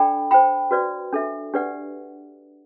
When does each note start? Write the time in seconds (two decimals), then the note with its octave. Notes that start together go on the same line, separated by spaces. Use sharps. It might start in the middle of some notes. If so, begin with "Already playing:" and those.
Already playing: D4 A4 D5 G5 B5
0.31 C5 G5 B5
0.71 F#4 B4 D5
1.13 D4 A4 E5
1.54 D4 G4 B4 D5 F#5